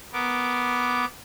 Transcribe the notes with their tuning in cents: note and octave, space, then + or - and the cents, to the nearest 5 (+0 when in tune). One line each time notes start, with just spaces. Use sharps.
B3 +0 A#4 +0 D6 -10